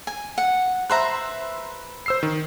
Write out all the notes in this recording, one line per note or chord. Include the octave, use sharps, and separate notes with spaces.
G#5
F#5
B4 C5 E5 A#5 C6 F#6
C5 E6 C7
D#3